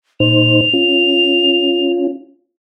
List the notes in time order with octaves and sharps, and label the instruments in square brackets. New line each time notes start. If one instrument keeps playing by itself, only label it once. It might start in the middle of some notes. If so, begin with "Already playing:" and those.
[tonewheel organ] A#2 D#4 C5 [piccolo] F7
[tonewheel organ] C#4 F4